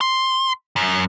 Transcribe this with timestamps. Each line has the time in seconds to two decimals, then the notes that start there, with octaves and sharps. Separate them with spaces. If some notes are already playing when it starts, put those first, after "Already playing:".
0.01 C6
0.76 F#2